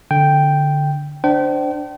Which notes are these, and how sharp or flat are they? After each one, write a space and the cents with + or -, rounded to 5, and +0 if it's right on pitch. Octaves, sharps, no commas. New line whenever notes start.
D3 +0 G5 +0
D4 +5 C5 -10 G5 -35